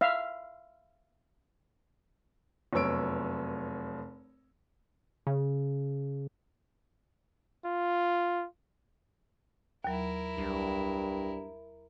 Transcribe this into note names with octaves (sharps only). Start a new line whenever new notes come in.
E5 F5
F1 F#2 B3 C#5 E6 D7
C#3
F4
D#2 F#3 E4 A#4
C2 G2